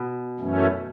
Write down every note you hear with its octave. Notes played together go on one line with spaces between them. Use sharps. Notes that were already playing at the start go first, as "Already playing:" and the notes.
Already playing: B2
F#2 E3 A3 C#4